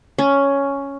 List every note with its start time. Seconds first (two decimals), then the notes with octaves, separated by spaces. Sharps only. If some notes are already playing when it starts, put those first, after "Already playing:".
0.18 C#4